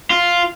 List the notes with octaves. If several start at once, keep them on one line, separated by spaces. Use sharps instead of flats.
F4